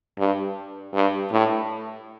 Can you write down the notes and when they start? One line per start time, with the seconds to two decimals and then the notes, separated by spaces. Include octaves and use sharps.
0.19 G2
0.94 G2
1.32 A2